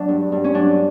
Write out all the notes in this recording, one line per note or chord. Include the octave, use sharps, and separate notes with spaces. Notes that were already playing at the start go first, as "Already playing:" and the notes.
Already playing: F#3 D4
G2
G2
C#4
F#3 D4